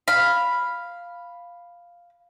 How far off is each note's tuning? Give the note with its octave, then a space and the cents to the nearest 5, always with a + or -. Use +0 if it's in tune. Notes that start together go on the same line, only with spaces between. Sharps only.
F5 +0 B5 +0